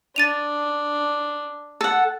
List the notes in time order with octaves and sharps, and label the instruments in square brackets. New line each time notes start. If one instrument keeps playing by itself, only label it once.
[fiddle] D4 [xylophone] A6 D#7 F7
[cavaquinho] A4 F#5